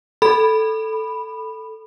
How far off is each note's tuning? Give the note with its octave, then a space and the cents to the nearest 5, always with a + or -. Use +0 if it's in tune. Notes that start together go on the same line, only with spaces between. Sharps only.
A4 +0 B5 +0